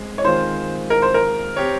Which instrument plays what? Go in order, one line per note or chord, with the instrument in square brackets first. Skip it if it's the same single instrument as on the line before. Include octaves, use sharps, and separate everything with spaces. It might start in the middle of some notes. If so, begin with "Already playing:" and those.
Already playing: [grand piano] G#3 C4
[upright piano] C#5
[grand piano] D#3 G#3 C4 F4 [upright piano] C5
[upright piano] A#4
C5
A#4
[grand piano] C4 G4 C#5